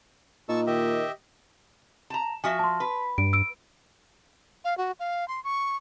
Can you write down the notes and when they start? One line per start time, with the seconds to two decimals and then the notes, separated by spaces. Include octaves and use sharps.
0.49 A#2 D#4 A5 C#6 E6
0.67 D#3 G4 D#5 E5
2.10 A5 A#5
2.44 F3 F#4 E5 G#5
2.59 A5 C6
2.80 B4
3.18 G2 D7
3.33 E6 D7
4.65 F5
4.78 F#4
5.00 F5
5.28 C6
5.44 C#6